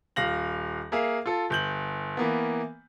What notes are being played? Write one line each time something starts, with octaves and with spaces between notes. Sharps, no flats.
D#1 F5 A#6 F#7
A#3 G#4 E5 F5
F4 A4
G1 G6 F#7
E3 A#3 B3